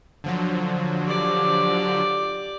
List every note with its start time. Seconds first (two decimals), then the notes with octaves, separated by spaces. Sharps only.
0.24 D3 F3 F#3
1.05 G4 D5